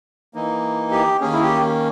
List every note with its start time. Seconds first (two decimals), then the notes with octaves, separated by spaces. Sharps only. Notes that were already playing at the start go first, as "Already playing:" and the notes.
0.34 E3 A#3 D#4
0.91 G4
1.20 D#3 A#3 C#4 G#4
1.33 E4
1.42 G4